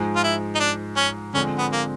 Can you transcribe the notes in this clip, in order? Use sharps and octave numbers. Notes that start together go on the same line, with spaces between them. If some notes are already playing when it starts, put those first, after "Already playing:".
Already playing: G#2 F3 G#3
F4
E4
D#4
D4
C#4
D3 F3 G#3 C4 C#4
B3
A#3